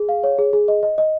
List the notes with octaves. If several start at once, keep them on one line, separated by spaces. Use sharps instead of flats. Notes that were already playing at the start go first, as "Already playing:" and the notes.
Already playing: G#4
F5
C#5
G#4
G#4
D#5
D#5
D#5